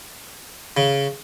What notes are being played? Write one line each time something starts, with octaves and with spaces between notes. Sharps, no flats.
C#3